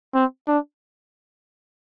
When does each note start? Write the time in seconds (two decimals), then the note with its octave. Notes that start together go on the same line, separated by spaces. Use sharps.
0.15 C4
0.48 D4